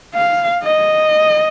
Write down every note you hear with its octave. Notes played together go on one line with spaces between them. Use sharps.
F5
D#5